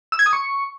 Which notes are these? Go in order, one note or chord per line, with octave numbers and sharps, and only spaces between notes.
E6
G#6
D#6
C#6